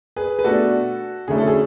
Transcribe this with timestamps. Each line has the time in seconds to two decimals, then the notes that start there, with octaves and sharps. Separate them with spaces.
0.16 G#4 B4
0.39 B4
0.44 B2 A3 D4 F#4 A4
1.28 D3 F#3 A3 C#4 E4 G#4
1.38 A4
1.47 G#4